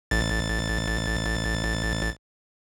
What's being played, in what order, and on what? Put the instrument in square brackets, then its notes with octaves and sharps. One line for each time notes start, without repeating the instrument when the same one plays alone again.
[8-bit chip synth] A1 A6